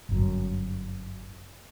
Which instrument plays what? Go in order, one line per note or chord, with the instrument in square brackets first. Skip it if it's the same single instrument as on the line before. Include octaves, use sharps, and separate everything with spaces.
[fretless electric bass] G1 F#2